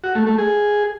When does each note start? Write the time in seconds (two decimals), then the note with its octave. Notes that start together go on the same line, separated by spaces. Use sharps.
0.04 F#4
0.15 A3
0.27 A3
0.38 G#4